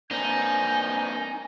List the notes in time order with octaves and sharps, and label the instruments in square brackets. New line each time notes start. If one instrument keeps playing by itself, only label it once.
[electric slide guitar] A#3 C4 D4 [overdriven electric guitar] D#4 [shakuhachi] G#5 [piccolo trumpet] G6